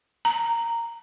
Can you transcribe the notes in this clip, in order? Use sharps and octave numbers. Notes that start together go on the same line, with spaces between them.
A#5